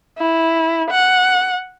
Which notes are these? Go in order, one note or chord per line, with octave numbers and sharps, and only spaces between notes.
E4
F#5